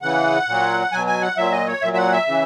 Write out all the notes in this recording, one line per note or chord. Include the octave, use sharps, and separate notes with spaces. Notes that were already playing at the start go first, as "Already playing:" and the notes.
C#3 E3 F#5
A#2 F#3
B2 F#3 G#5
G#5
F#5
A#2 F#3 E5
D#5
C#5
A#2 F#3 E5
E5
F#5
E5
C#3 E3